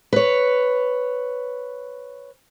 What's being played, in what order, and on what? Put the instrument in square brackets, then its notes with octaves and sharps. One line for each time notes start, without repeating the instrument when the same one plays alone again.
[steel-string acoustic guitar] B4 C#5